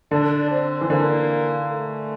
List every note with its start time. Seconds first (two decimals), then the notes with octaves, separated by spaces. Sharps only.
0.11 D3 D4
0.51 C4
0.81 E3
0.90 D3 A#3
1.69 A3